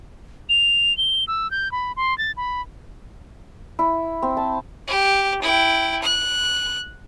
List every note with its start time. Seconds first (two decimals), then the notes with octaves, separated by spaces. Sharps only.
0.49 F7
0.97 G7
1.28 E6
1.51 G6
1.72 B5
1.97 C6
2.18 A6
2.37 B5
3.79 E4
4.22 C4
4.37 A5
4.87 G4
5.42 E4 G5
6.03 F#6